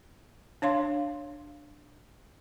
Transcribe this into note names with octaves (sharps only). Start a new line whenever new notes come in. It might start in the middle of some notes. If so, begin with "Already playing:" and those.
D4 C#5 F5 C6